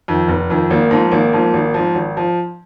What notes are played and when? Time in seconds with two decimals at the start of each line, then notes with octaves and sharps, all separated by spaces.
0.08 F2 D#3
0.28 F1
0.50 F2 D#3
0.70 G#1 A#3
0.91 G#2 F3
1.11 G#1 A#3
1.33 G#2 F3
1.54 G#1
1.74 G#2 F3
1.95 G#1
2.17 F3